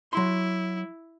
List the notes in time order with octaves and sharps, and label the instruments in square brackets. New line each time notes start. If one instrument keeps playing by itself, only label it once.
[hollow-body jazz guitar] F#3 C6 [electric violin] E4